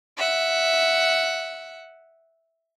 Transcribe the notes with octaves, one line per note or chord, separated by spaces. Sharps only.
E5 F#5